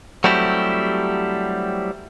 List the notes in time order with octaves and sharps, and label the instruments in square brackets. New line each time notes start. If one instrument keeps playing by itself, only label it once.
[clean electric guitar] F#3 G3 A3 C4 E4 G4